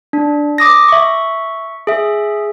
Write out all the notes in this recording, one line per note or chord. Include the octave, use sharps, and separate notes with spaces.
D4
D6 D#6 A#6
E5 C#6
G#4 E5